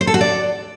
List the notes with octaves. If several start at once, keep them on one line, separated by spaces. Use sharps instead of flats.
C5
A4
F#4
D5